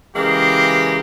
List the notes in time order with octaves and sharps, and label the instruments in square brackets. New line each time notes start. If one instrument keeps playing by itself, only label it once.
[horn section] C#3 E3 G#3 A#3 G4